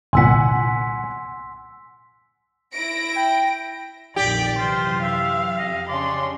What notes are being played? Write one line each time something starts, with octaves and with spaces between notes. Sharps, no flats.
G1 C2 A#2 F#5 G#5 C6 E6 B6
E4 A#6 D7
G5
A#1 F2 D#3 G4 D5
F#2 C3 E3 F4 C5
E5 F5
F2 D#5
C#3 C#4 D4 D5 C6